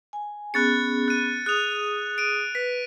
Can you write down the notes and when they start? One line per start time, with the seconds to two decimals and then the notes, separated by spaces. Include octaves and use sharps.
0.13 G#5
0.54 B3 C#4 G#4 F#6 A6 C#7
1.08 F#6 D#7
1.46 G#4 D#6 F#6 F7
2.18 D7 D#7
2.55 B4 B6